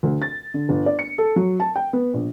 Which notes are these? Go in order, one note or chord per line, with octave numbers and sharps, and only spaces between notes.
D2
A6
D3
G1
D5
C#7
A4
F#3
A5
G5
B3
A#1